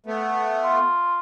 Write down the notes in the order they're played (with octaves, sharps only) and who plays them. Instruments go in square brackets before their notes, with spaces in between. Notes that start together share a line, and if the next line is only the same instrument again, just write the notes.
[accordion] A3 B3
[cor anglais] F4